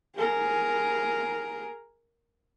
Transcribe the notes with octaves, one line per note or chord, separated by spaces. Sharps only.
G#4 A#4